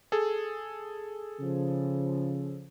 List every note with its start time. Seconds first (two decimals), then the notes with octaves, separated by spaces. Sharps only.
0.12 G#4 A4
1.40 C#3 F3